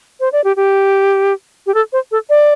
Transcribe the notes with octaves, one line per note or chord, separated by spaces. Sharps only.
C5
D5
G4
G4
G4
A4
C5
A4
D5